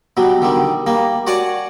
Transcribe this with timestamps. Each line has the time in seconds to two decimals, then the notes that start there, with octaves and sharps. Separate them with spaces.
0.17 B2 F#3 G3
0.42 D3 D#3 G3
0.87 G3 A#3
1.27 F#4 C#5 D5 F#5 G#5 A5